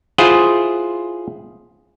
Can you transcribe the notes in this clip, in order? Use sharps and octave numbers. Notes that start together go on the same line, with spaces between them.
E4 F4 G#4 C5 F#5